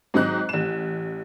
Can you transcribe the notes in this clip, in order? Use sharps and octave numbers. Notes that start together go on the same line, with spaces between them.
G#2 F#3 C4 D#5 F#6
A1 E7